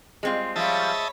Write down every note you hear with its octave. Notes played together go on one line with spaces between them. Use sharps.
G3 G#3 C4 F4
F3 G3 C#5 D#5 E5 A5 B5 C#6